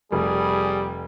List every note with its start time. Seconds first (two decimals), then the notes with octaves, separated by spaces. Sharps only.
0.12 F1 G3 G#4